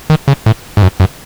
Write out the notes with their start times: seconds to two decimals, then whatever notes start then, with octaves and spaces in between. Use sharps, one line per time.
0.10 D#3
0.28 C#3
0.46 A2
0.77 G#2
0.83 F#2
1.00 F#2